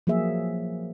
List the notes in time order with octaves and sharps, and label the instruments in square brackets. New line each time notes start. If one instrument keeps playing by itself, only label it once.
[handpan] F3 F#3 A#3 G#4 E5